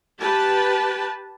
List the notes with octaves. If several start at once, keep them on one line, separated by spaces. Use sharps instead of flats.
G4 B4 A5